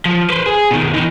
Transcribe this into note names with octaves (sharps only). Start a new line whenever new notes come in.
F3
B4 C5
G#4
B2 D#3
E3 D#4